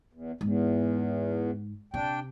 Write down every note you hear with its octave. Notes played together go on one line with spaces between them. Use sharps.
E2
E2 G#2
C3 D4 G5